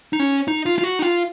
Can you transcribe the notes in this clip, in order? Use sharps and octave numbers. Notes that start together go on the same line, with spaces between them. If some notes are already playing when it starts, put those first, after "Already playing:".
D#4
C#4
D#4
F4
F4
F#4
D#4
F4